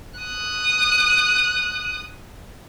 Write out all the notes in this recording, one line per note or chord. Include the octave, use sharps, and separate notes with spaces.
D#6 F#6